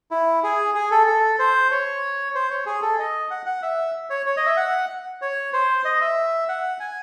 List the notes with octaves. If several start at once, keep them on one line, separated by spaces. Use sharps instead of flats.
E4
G#4
G#4
A4
A4
C5
C#5
C5
C#5
G#4
A4
D#5
F#5
F#5
E5
C#5
C#5
D#5
E5
F#5
C#5
C5
D#5
E5
F#5
G#5